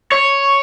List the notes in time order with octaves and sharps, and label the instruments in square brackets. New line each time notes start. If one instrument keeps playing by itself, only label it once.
[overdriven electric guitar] C#5